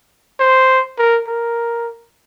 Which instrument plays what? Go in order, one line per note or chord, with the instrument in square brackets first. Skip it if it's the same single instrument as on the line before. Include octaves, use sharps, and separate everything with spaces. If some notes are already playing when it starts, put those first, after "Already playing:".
[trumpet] C5
A#4
A#4